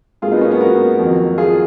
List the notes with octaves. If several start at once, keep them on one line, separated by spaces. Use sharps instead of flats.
G#2 F#3 A#3 F4 G#4
B3 D#4
A#3 C#4
B3
F#4 A#4
F2 D#3 F#3
F4 G#4